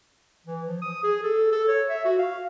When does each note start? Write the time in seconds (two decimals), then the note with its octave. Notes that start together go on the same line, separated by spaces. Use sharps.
0.47 E3
0.67 F3
0.82 D#6
1.03 G#4
1.23 A4
1.52 A4
1.68 C#5
1.89 E5
2.05 F#4
2.19 F5